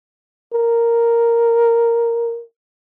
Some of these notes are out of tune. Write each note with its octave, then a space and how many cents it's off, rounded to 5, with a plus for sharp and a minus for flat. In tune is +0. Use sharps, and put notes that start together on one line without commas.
A#4 +0